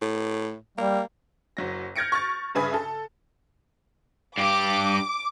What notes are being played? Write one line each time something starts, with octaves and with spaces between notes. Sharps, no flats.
A2
G3 A#3
F#1 F#3 A#6
F6 G6 G#6 A#6 C#7 D7
C#6 F6 A6
G2 C#3 B4 E5 G#5 D#6
A4
G2 G4 D6